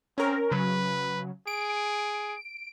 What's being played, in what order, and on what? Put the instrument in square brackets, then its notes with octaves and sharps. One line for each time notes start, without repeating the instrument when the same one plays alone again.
[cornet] C4 [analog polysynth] C#4 A#4
[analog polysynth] C#3 F#3 [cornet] B4
[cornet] G#4 [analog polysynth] D7